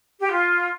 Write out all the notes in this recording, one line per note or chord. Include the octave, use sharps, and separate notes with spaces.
G4
F4